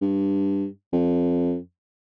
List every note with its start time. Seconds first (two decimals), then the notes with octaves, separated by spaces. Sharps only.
0.01 G2
0.93 F2